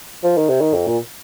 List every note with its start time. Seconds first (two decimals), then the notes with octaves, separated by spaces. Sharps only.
0.24 F3
0.37 D#3
0.49 C3
0.61 D#3
0.74 F2
0.87 A#2